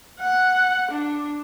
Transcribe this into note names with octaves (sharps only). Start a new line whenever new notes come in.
F#5
D4